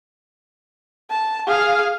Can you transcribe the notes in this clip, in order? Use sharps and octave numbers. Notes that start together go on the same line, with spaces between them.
A5
G#4 F5